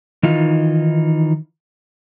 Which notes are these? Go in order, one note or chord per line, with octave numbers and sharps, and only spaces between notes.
D#3 E3 D#4 F4